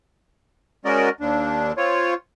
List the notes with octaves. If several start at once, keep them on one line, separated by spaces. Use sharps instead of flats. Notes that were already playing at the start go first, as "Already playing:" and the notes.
G#3 C#4 F#4 A#4 D5 D#5
D#2 D4
C4 F4 C#5